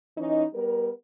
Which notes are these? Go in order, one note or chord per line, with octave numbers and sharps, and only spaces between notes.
E3 C#4 D#4
G3 B3 A#4